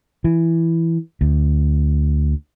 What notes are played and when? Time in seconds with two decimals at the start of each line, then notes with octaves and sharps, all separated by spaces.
0.24 E3
1.21 D2